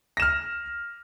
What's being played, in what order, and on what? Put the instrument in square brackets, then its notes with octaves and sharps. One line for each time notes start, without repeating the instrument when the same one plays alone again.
[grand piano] A#6
E7
F6